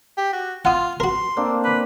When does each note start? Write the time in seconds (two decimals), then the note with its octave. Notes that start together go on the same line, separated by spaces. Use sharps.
0.17 G4
0.33 F#4
0.65 F4 F#5 D#6
1.00 F#4 A#4 C6
1.37 A#3 C4 D4
1.64 B4